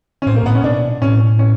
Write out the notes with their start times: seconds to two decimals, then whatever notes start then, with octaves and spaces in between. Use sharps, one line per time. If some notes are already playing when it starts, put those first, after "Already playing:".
0.22 C#4
0.26 A2 C4
0.35 A#2 A#3
0.43 A2 B3
0.54 A#2 C#4
0.64 B2 D4
1.02 A2 C#4
1.39 C#4